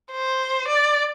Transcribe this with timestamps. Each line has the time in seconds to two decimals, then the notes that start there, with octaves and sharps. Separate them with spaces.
0.11 C5
0.68 D5